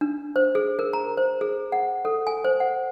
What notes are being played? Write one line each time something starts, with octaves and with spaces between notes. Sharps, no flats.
D4
C5
G#4
A#4
A#5
C5
G#4
F#5
A4
G#5
C5
F#5